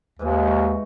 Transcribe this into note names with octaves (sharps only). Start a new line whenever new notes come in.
D#2 G#2 E3 G#3
F#4